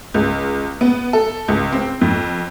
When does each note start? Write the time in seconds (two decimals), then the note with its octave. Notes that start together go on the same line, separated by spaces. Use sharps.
0.14 C#2
0.81 B3
1.13 A4
1.48 C#2
1.73 C4
2.01 F2